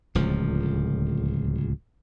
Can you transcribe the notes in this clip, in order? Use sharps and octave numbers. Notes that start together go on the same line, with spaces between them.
D1 C#2 F3